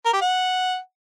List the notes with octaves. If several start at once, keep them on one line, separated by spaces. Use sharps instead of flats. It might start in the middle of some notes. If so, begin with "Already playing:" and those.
A#4
G4
F#5